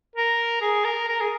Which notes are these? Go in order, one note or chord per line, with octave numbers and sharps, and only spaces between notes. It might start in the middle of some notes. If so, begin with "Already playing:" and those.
A#4
G#4
A#4
A#4
G#4